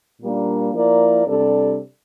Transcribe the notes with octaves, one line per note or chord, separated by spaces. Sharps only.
A#2 G3 A#3 D4
F3 A#3 E4 A#4 D5
C3 G3 D4 A4 D5